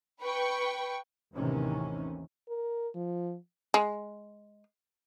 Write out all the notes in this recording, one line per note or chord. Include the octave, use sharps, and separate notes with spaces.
B4 G5 C#6
A1 D#2 C3 D#3 E3 C#4
A#4
F3
G#3